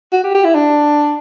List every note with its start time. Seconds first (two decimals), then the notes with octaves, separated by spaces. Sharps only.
0.12 F#4
0.24 G4
0.35 G4
0.45 E4
0.55 D4